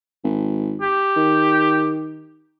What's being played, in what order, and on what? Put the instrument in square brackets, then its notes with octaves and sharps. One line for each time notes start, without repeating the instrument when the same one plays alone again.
[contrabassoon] G#1
[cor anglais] G4
[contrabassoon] D#3